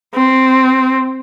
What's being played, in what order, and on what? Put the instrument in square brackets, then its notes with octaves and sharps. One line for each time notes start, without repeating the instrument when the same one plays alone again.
[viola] C4